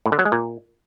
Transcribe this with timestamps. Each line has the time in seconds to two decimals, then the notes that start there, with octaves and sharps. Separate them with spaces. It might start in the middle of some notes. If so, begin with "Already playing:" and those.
0.06 A2
0.12 D3
0.19 F#3
0.25 G#3
0.32 A#2